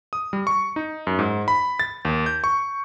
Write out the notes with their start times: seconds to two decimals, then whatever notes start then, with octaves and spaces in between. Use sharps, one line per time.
0.13 D#6
0.33 G3
0.47 C#6
0.76 D#4
1.07 F#2
1.19 G#2
1.48 B5
1.79 A6
2.05 D#2
2.26 G6
2.44 C#6